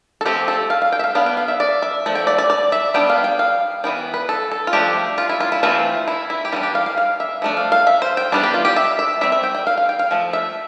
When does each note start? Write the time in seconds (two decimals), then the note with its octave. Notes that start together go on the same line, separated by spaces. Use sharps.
0.21 A4
0.26 F3 A3 C4 G4
0.48 A4
0.70 F5
0.82 F5
0.92 G5
0.99 E5
1.04 F5
1.15 G3 B3 D4 F5
1.26 G5
1.37 F5
1.48 E5
1.60 D5
1.82 E5
2.06 F3 A3
2.15 G5
2.27 D5
2.39 D5
2.50 D5
2.72 E5
2.94 G3 B3 D4 G5
3.10 F5
3.24 G5
3.39 F5
3.84 E3 B3 D4 G5
4.14 B4
4.29 A4
4.52 A4
4.67 F4
4.73 F3 A3 D4 G4
5.18 F4
5.29 E4
5.40 F4
5.52 E4
5.63 E3 A3 C4 F4
6.08 E4
6.30 E4
6.45 G4
6.52 E3 G3 D4 F4
6.63 G4
6.75 F5
6.86 F5
6.98 F5
7.20 E5
7.42 F3 A3 D4
7.57 F5
7.72 F5
7.87 E5
8.02 C5
8.17 G5
8.32 E3 G3 B3 D4
8.43 G4
8.54 F4
8.65 G4
8.76 E5
8.99 E5
9.21 G3 C4 E5
9.32 E5
9.44 G5
9.55 G5
9.67 F5
9.78 F5
9.89 G5
9.99 F5
10.11 F3 A3
10.33 E5